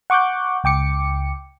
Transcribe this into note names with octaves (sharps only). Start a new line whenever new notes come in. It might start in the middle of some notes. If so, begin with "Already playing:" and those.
F#5 C#6 D6 F#6 G6
C#2 G5 D6 C#7